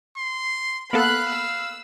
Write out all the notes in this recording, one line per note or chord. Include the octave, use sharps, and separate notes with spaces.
C6
A#3 B3 A4 F5 B5 F#6
E6